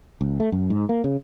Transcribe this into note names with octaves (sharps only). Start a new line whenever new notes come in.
C#2
A3
F#2
G#2
A#3
C#3